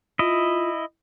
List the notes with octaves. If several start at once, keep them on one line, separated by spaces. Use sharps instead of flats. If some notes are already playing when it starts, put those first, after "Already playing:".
E4 F4 D#5